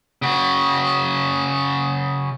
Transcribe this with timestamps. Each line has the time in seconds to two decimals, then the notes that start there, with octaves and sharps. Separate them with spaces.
0.22 C#3 F#4